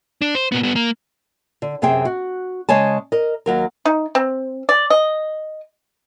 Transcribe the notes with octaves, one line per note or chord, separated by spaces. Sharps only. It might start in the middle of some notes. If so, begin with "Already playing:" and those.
D4
C5
A#2 B3
G3 B3
A#3
D3
F#2 C3 C4 G#4 G5
F#4
C#3 G#3 C#5 G#5 A5
A#4 D#5
D#2 F#3 A#4
D#4
C4
D5
D#5